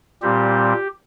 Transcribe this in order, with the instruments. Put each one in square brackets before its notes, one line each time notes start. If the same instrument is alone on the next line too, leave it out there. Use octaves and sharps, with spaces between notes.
[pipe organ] A#2 G3 C4 G4